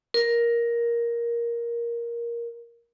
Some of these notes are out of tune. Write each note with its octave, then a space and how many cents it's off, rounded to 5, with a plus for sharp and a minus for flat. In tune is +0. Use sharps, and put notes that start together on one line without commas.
A#4 +10